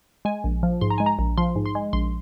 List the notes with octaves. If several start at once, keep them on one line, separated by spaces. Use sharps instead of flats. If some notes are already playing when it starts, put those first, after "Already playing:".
G#3 G#5
A#1
F3
G#2 C6
A#5
G#3 G#5
A#5
A#1
F3 C6
G#2
C6
G#3
A#1 C6